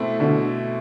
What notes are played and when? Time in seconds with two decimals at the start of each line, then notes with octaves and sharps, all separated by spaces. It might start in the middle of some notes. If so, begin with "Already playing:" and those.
Already playing: B2 A3 C4 E4
0.20 B2 D3